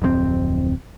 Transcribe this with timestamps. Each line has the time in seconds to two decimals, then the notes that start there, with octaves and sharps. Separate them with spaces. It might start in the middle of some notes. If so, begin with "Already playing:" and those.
0.02 D1 F2 G#3 C4